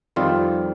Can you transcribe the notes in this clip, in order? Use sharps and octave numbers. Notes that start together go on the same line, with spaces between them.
F2 D#3 G3 C4 F4